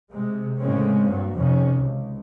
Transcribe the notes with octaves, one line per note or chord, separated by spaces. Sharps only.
C3 G#3
A2 C#3 G#3 A#3 C4 C#4
G2 A#2 F#3
F2 C3 D#3 C#4
C#2